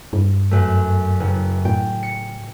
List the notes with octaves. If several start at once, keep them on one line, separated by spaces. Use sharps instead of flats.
G2
F#2 A3
F#1
A2 G5
C#7